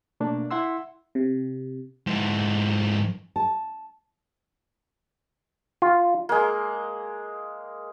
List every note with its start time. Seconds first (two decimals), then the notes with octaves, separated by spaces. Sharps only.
0.20 B2 A3 A#3 D4
0.51 E4 E5 F#5 C6 E6
1.15 C3
2.07 G#2 E3
3.36 A5
5.82 F4
6.29 G#3 A#3